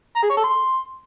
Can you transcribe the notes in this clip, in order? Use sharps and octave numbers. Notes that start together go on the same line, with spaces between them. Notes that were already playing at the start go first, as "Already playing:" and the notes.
A#5
G#4
C#5
A4
C6